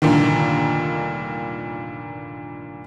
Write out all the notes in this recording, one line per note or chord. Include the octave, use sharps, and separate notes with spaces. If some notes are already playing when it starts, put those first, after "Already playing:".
F1 G2 A#2 D3 D#3